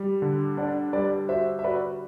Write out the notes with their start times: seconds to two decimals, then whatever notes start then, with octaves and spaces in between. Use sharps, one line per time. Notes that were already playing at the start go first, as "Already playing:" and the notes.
Already playing: G3
0.22 D3
0.57 D4 D5 F#5
0.93 G3 B4 D5
1.29 F#4 C5 E5
1.59 E5
1.64 F#4 B4 D5